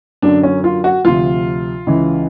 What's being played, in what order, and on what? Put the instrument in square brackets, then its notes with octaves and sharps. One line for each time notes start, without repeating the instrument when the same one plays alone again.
[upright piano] F#2 D3 F#3 D4
C#4
F4
F#4
D2 C3 F3 F4
C#2 C#3 E3